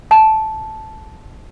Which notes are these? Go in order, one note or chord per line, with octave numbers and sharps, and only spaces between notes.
A5